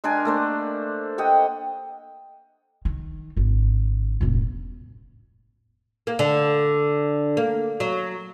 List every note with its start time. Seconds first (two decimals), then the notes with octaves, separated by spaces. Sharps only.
0.04 G#3 D4 A#4 G#5
0.25 A3 A#3 C5
1.18 D#5 F#5 G5 A#5
2.85 D#3
3.37 G#1 D3
4.21 E1 A1
6.07 A#3
6.19 D3
7.37 A#3
7.80 F#3